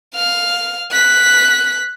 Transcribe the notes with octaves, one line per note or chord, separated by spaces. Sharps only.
F5 F6
F#6 B6